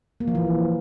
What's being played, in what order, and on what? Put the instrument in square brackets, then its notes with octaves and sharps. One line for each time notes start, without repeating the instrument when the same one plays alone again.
[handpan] A#3
F3
E3